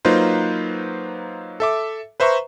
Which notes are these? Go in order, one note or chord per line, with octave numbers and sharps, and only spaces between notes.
F#3 A#3 D#4 F4 B4 C5
A4 E5 D6
B4 C5 E5 A#5 C#6